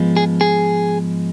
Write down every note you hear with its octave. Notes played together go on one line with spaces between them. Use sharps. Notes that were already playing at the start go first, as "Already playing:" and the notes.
Already playing: G#2 F3 G#3 B3
G#4
G#4